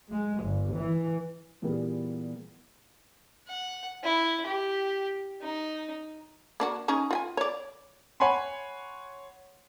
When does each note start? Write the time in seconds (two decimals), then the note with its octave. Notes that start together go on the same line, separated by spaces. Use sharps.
0.11 G#3
0.43 G1
0.74 E3
1.62 A#2 E3 G3 A#3 B3 G#4
3.48 F#5
4.04 E4
4.46 G4
5.42 D#4
6.60 A#3 D4 F#4
6.88 C#4 D#4 G#4
7.11 F4 G5 G#5
7.37 C#5 D5
8.20 C#5 F#5 G#5 B5 C6